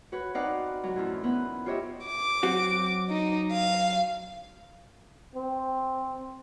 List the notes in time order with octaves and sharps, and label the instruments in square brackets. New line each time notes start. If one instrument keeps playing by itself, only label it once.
[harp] F#4 B4 C#5
C4 D#4 B4 D5 F5 F#5
F#3 F#4
F#2 A2 E3 F3
B3 B4 B5
F4 G4 C#5 D#5 E5
[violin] D6
[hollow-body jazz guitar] F#3 C4 F#4
[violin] D#4
F5
[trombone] C4